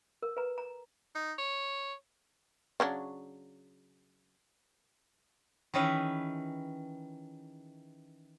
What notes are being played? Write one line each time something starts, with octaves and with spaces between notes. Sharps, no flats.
A#4
B4 A#5
A#5
D#4
C#5
C#3 F#3 D4
D#3 E3 C#4 G#4 B4 E5